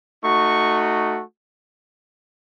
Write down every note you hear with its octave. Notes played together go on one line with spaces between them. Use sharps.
A3 D#4 F#4 C#6